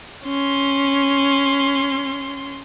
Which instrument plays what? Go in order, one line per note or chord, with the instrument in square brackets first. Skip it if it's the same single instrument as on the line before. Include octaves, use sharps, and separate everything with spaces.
[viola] C#4 C6